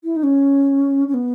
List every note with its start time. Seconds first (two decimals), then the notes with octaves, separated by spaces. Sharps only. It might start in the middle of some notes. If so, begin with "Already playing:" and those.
0.04 E4
0.16 D#4
0.23 C#4
1.08 C#4
1.14 B3